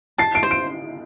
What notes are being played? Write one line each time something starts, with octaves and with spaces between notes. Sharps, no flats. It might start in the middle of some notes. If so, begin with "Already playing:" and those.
A5 C7
D7
C5
D7